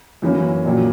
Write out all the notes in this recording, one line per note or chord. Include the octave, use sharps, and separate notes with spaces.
F#2 E3 A#3 C#4
A#1 A#2 F#3